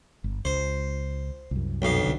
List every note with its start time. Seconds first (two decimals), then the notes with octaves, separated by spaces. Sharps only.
0.24 G1
0.45 C#2 C5
1.51 C2 F#2
1.82 B1 F2 F5
2.03 C2 D3